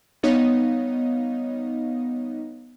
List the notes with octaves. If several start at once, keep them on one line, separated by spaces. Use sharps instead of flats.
G3 B3 D#4 C#5 D#5 F5